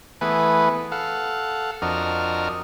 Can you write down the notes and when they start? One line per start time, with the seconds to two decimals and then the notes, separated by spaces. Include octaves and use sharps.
0.21 E3 A3 B3 G#4 B4
0.92 A4 F5 F#5
1.82 F2 D4 F#4 A#4 D#5 F6